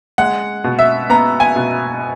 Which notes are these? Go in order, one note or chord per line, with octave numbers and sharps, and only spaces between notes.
G#3 F#5
B2
E5
B3 A#5
G#5
B2